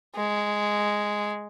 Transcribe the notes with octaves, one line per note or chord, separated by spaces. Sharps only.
G#3